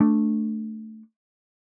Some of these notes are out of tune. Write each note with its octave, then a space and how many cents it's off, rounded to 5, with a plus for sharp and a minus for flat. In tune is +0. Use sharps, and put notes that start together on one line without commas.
A3 +0 D4 +0